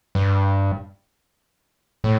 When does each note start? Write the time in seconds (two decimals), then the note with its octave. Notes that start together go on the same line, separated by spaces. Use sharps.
0.15 G2
2.04 A2